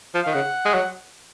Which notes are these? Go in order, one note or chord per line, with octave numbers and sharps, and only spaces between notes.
F3
D#3 F5
C#3 F#5
G#3
F#3